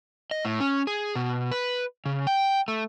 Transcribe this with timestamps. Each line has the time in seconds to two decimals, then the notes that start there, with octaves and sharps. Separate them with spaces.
0.31 D#5
0.45 A2
0.60 C#4
0.87 G#4
1.16 B2
1.52 B4
2.06 C#3
2.27 G5
2.68 A3